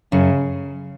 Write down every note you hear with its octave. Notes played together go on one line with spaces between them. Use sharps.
F#2 C#3